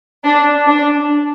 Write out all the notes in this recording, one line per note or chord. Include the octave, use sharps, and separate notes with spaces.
D4
D4